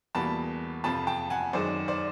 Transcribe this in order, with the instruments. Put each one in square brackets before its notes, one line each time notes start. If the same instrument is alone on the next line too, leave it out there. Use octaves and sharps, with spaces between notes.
[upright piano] E2 B2 G3 A#3 A5 B5
F2 C3 F3 A5 B5
G5 A5
F#5 G#5
F#2 D#3 G#3 C5 D5
C5 D5